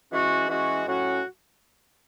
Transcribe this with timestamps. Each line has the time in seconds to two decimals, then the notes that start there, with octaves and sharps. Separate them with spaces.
0.12 E3 G#3 C#4 F#4
0.49 E3 G#3 C#4 F#4
0.87 A2 F#3 C#4 F#4